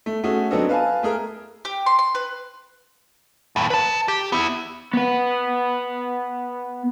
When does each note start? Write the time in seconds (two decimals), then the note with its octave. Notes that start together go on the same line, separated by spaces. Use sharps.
0.06 A3
0.24 A3 C#4 F#4 G#4
0.51 F#3 B3 C4 D4 A4 D#5
0.69 B4 F5 G#5 A5
1.03 A3 G#4 A#4
1.65 G4
1.86 C6
1.99 C6
2.15 B4
3.56 D#2 A2
3.70 B4 A5
4.08 G4
4.32 B3 E4
4.94 B3 B4